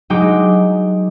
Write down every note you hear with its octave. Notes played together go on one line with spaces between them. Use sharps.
F#3 G#3 D#4 G5 D6